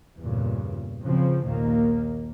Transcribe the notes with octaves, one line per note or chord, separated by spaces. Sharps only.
E2 G2 A#2 C#3
C#3 F3 C4
A#1 D#2 A#2 D#3 A#3